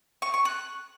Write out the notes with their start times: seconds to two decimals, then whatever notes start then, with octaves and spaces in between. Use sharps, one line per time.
0.22 C#6
0.34 C#6
0.45 F#6